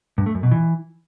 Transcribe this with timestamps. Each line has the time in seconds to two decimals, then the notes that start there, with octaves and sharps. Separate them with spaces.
0.18 G2
0.26 A3
0.35 F#2
0.43 B2
0.51 E3